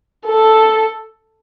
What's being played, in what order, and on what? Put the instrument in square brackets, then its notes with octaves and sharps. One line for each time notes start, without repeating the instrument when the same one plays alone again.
[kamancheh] A4